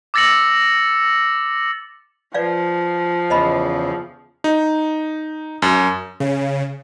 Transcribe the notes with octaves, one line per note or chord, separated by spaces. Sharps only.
D6 E6 A6 A#6 C#7 F#7
F3 B4 D5 F5
E2 C#3 C5 D#5 B5
D#4
F#2
C#3